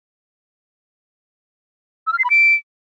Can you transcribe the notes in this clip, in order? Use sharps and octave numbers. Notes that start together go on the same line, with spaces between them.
E6
F6
C7
B5
D7